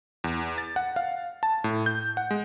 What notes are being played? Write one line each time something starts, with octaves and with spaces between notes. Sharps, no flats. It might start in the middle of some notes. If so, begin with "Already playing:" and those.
E2
A6
F#5
F5
A5
A2
G6
F#5
G#3